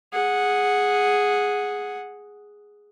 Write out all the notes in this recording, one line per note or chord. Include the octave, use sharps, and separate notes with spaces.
G#4 F#5